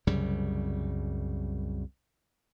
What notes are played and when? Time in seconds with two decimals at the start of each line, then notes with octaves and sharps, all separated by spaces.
0.07 C2 F#2 C#3 G3